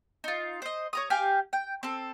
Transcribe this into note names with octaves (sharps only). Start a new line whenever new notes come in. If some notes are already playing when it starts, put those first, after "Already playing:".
D#4 F4
C5 D#5
C#5 A#5 D#6
G4 F5 G5 G#5
G5
C4 A4